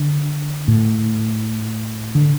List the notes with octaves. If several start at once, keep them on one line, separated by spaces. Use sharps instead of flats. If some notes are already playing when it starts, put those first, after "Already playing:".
Already playing: D3
A2
D3